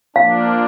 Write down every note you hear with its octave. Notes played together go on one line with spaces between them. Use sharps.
F3 A#3 D4 F5